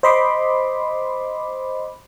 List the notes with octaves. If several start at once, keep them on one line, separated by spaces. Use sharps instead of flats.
C5 D#5 B5 C6 D6